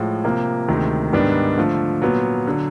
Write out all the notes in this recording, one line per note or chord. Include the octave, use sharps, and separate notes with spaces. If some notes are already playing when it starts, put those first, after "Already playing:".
Already playing: A2 F3 G#3
C3 F3 A#3
D2 C3 D#3 G#3
G#2 D#3 G3 B3 D4
D3 F3 A3
A#2 F#3 B3
D3 F#3